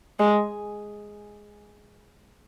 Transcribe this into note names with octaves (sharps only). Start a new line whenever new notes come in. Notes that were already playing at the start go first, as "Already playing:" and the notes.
G#3